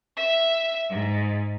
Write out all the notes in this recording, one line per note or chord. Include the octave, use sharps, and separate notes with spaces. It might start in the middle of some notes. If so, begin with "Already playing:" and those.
E5
G#2